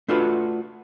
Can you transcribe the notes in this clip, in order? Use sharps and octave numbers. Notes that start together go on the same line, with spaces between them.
A3 D4 F4 F#4 A4 B4